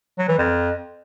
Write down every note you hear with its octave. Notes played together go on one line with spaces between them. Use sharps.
F#3
E3
F2